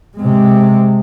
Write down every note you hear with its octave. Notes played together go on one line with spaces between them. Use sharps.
C3 G#3